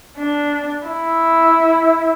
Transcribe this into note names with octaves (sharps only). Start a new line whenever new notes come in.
D4
E4